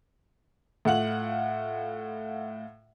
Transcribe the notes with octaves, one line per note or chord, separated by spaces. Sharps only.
A2 F4 F#5 F#7